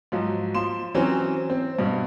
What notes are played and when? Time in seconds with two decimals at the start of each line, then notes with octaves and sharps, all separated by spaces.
0.12 G#2 F3 F#3
0.55 F3 C6 E7
0.95 E3 F#3 C4 C#4
1.50 C4
1.79 G2 B2